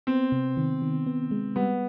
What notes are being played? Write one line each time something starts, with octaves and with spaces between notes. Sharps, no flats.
B3 C4
C3
D#3
D#3
B3
G#3
G3 B3